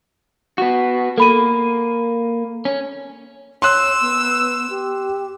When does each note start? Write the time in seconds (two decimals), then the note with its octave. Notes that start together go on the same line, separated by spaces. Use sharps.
0.58 B3 F#4
1.18 A#3 A4 B5 D#7
2.65 C#4
3.62 C#5 C6 E6 F#6
4.01 B3
4.70 G4